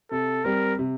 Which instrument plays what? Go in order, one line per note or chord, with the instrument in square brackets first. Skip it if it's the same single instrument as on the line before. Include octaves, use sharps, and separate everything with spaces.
[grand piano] C3 [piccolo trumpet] A4
[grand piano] G3 C4 [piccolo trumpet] A#4
[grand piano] C3